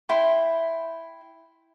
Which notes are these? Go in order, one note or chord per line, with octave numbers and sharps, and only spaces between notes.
E4 G5 C6